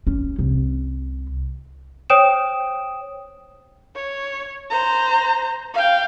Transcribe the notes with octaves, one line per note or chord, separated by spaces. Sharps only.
C#4
C2
C5 C#5 G5 D#6 D7 E7
C#5
C5 A#5
F5 G5